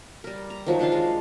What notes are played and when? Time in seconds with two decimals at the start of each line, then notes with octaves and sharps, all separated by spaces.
0.24 G3 A#4
0.50 A#5
0.66 D#3 F3 F#3
0.79 F#3 D4 F4 F5
0.92 G#3